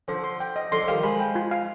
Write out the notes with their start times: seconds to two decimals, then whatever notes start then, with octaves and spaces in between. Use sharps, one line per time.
0.08 D3 F3 C5
0.24 C6
0.40 G5
0.56 D#5
0.72 D3 F3 C6
0.83 F3
0.88 D#3 G3 F5
1.03 F3 G#3 B5
1.20 G5
1.35 F4
1.51 F5